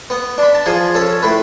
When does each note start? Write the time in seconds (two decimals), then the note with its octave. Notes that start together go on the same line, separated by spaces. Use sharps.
0.10 B3
0.38 D4 B5
0.55 A5
0.66 F3 G#4 G#5
0.95 C#4 A4 A5
1.23 A2 B4 B5